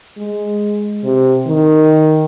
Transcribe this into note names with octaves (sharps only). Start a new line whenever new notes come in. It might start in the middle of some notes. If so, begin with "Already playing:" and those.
G#3
C3
D#3